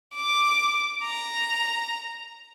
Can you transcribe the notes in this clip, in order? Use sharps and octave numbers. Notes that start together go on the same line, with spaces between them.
D6
A#5